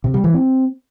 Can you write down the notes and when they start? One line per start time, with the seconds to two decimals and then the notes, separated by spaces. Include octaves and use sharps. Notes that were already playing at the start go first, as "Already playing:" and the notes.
0.04 C3
0.14 G3
0.24 E3
0.34 C4